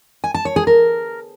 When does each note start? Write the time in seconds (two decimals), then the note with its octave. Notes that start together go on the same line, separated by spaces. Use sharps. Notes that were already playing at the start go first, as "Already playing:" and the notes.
0.24 G#5
0.34 A5
0.45 C#5
0.56 G#4
0.67 A#4